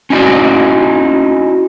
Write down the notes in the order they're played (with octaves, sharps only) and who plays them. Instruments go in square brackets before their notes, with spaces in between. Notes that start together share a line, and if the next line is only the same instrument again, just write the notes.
[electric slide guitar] C#4 D#4 E4 F#4 D5